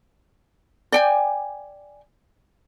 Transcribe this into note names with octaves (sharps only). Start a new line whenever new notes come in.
D5 G5 G#5